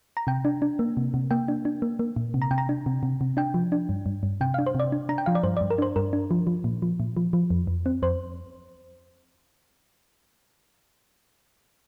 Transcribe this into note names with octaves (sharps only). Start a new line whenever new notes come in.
A#5
C3 G5
D4
D4
A#3
C3
C3
A#3 G5
D4
D4
A#3
A#3
A#2
C3
A#5
C3 G5
A#5
D4
C3
C3
C3
D4 G5
F3
D4
G2
G2
G2
C3 G5
F5
D4
C5
C3 D5
D4
D4 A#5
G5
F3 F5
D5
G2 C5
D5
G2
A#4
D4 C5
G2 A#4
D4
F3
F3
A#2
F3
A#2
F3
F3
F2
F2
C4
F2 C5